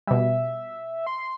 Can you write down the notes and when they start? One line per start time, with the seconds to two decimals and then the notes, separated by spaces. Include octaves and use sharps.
0.07 B2 G3 E5
1.07 C6